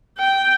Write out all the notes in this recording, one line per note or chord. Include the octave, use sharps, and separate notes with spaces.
G5